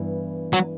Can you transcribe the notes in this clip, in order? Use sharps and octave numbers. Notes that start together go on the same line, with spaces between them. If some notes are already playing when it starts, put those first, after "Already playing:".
Already playing: G2 E3 B3 E4
F#3